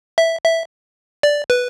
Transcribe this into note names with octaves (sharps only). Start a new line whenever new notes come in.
E5
E5
D5
B4